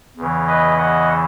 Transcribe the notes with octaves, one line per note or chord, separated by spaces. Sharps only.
E2 C#3 E3
B4 D#5
D#5 F#5